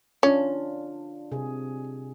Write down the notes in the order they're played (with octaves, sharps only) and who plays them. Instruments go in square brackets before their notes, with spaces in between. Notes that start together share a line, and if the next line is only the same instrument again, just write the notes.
[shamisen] C#4 [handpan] D4 F4
[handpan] C3 G#4